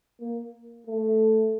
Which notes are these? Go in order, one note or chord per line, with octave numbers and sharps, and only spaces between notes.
A#3
A3